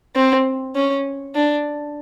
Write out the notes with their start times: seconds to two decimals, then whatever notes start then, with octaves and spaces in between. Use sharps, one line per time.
0.16 C4
0.75 C#4
1.35 D4